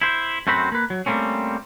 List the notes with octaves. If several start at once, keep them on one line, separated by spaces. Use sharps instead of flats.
E4 C5
F#2 A3 C4 F#4 C5 B5
A#3 B4
F#3
G3 A3 A#3 C4 C#4